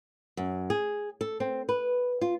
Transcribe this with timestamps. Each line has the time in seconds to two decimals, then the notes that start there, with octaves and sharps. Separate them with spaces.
0.37 F#2
0.70 G#4
1.21 A4
1.40 C4
1.69 B4
2.21 F4